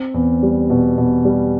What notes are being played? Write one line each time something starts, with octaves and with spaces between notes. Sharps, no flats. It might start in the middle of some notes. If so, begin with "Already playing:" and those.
Already playing: C4
E2
G3
B2
B2
G3